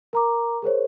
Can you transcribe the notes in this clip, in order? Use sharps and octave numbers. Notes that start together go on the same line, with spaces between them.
A#4 A#5 D6
G#4 A#4 C5 C#5